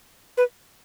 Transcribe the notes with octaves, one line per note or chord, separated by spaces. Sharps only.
B4